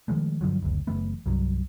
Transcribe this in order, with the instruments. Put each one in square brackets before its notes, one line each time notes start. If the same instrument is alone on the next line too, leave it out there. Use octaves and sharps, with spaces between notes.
[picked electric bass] D#3 F3 G#3 A3
G2 D3 F3 F#3
F#1 D2
F#1 E3 A3 B3
C2 G2 F#3